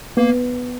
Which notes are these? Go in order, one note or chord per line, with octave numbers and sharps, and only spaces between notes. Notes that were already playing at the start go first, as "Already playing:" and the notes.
A#3 B3